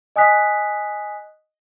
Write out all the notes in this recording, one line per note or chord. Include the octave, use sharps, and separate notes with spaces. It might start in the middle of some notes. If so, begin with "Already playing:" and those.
D#5 G#5 D#6 F#6 B6